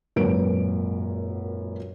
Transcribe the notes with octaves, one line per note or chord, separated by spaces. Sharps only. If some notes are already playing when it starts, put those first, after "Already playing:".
G#1 F#2 A#2 A#4 B4 D7